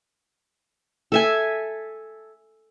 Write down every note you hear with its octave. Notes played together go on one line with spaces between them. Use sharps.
A4 E5 G#5